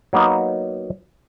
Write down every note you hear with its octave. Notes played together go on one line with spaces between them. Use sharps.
F#3 A#3 B3 D#4